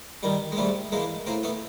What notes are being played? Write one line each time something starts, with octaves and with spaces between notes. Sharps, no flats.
D#3 G3
G#3
G#2 G3 A3
E3 G#3 A#3
A2 A#3 C4
A3 B3